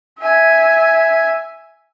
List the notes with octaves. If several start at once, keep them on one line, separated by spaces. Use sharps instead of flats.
E5 G#5